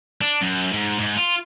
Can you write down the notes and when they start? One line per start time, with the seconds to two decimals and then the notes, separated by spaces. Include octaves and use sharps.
0.21 D4
0.41 F#2
0.72 G#2
0.98 G#2
1.17 F4